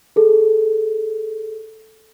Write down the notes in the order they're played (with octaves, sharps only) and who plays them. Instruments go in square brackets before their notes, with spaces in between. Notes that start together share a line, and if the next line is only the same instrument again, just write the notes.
[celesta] G#4 A4